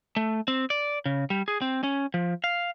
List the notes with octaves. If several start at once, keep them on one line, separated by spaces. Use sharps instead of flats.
A3
C4
D5
C#3
G3
G#4
C4
C#4
F3
F5